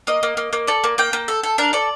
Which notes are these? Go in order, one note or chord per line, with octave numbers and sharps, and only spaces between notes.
A#3 D#5
A#3
A#3
A#3
A4 D5
A#3
A#3 G5
A#3
A4
A4
D4 A#4
A4 D5